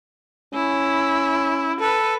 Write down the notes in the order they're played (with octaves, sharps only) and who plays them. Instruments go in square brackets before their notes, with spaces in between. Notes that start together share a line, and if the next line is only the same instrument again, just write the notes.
[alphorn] C#4 [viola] E4
[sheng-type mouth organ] A4 [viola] B4